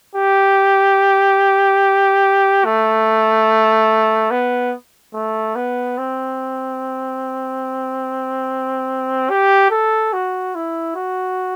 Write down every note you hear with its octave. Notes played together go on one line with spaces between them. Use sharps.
G4
A3
B3
A3
B3
C4
G4
A4
F#4
E4
F#4